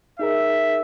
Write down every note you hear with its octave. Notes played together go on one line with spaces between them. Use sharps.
D#4 G#4 A#4 E5